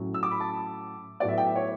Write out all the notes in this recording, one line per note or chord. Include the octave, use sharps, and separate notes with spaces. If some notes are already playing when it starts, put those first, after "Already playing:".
Already playing: A2 F#3 C#4
E6
D6
B5
A5
A2 F#3 B3 D5
E5
G5
E5
C#5